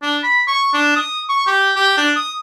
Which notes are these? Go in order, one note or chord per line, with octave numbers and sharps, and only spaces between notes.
D4
B5
C#6
D4
D#6
C#6
G4
G4
D4
D#6